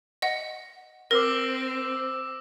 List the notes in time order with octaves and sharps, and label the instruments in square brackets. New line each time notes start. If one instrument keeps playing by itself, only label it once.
[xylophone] D#5 F#5
[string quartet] C4 [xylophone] A#4 [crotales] D6 E6 A#6